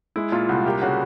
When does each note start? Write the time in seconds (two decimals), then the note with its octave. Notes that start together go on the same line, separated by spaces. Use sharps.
0.16 G#3 E4
0.32 A#2 F4
0.49 C2 F#4
0.65 A#3 G4
0.82 C#3 F#4